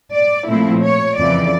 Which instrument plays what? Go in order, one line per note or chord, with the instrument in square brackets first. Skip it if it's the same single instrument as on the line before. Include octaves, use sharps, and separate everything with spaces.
[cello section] D5
A#2 F3 A3 C4 E4
C#5
F2 C#3 E3 D5